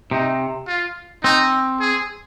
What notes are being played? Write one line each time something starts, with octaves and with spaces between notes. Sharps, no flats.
C3 D#4
F4
C4 D#4
G#4